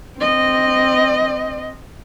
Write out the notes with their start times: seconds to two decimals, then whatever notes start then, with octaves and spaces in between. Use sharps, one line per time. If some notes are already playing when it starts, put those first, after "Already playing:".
0.20 C4 D#5